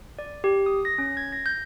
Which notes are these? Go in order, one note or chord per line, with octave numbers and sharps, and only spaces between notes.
D5
G4
D#6
A#6
C#4
G#6
A#6
G6